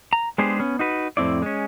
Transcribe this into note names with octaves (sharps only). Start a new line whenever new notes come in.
A#5
G#3 B3 D4 G4 G#4 C5
B3 C#4
D#4 F#4 B4
F2 A2 C4 E4 D5
G#3 C#4